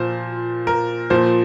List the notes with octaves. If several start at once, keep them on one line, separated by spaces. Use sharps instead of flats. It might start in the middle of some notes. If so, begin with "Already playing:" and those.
Already playing: A#2 F3 F4 C5
A#4
A#2 F3 C5